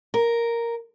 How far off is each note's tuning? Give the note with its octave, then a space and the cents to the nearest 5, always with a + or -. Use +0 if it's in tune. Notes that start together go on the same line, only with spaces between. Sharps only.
A#4 +0